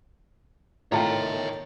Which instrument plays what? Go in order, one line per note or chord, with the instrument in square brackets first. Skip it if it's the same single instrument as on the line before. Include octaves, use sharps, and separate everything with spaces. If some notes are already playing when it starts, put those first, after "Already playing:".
[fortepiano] A2 F4 [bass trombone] D#3 [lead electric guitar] C#5 E5 [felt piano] G5 A5 A#5